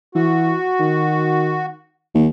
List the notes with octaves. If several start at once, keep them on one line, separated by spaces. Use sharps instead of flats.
E3 F#4
D#3
D#2